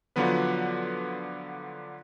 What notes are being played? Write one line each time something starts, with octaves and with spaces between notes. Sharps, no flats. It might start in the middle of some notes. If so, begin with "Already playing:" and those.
D3 F3 F#3 B3 B4